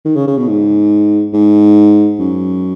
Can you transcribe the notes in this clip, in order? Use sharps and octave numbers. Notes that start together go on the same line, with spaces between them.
D#3
C#3
C#3
B2
G#2
G#2
F#2